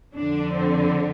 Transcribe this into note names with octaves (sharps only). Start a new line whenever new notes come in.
F2 D3 D4
C4